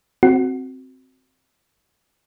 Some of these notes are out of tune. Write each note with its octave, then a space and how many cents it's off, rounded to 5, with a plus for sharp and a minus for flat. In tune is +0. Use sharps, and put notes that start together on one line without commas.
C4 +0 F#4 +0